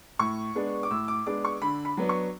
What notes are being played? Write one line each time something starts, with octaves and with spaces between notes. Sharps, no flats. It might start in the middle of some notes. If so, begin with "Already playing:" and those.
A2 C#6
G#3 B3 D4
D6
A2 E6
D6
G#3 B3 D4 D6
C#6
D3 B5
B5
F#3 B3 D4
C#6